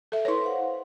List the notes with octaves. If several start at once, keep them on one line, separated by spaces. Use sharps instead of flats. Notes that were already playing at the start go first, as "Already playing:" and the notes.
A4 E5
E4 B4 C#5 C6
C5 F5 F#5